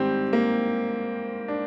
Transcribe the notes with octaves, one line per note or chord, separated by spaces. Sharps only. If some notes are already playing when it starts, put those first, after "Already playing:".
Already playing: G#2 D#3 G3 C4 G4
A#3
D4